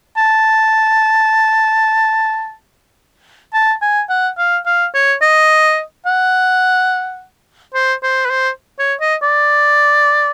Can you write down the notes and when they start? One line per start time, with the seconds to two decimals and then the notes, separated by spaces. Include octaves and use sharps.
0.17 A5
3.54 A5
3.82 G#5
4.09 F#5
4.38 F5
4.66 F5
4.94 C#5
5.22 D#5
6.06 F#5
7.74 C5
8.03 C5
8.25 B4
8.30 C5
8.79 C#5
9.01 D#5
9.22 D5